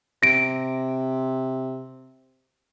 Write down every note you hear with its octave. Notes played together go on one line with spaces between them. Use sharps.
C3 A#6 D7